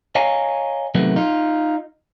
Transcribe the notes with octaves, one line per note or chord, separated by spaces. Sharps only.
C#5 D#5 F5 G#5 A#5
C3 D#3 F#3 A3 B3
D#4 F4